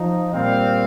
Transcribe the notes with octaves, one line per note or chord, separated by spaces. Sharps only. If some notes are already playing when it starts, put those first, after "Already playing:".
Already playing: F3 D#4
A#2 G3 C4 F5